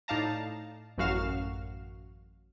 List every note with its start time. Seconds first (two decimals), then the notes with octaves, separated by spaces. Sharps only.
0.08 A2 D#4 D5 F5 A5 A#5
0.98 A1 F#2 F#4 F5 F6 E7